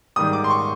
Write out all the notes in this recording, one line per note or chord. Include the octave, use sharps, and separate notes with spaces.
G#2 D#3 G3 D#6
D6
C6
C#6